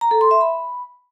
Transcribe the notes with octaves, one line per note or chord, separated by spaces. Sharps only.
A#5
A4
C6
E5
B5